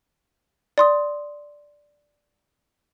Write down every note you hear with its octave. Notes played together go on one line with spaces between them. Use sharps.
D5 C6 D#6